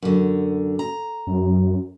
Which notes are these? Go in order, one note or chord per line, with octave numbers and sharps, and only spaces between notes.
F#2 D3
A#5
F#2